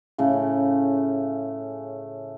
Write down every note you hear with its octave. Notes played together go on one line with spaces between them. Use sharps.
A2 C#3 A3